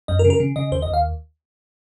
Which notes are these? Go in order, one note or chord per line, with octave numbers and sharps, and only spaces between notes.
F#2 D#5
A#4
C#3
A#4
C#3
C#3 D#5
D#2 C5
D#5
D#2
F5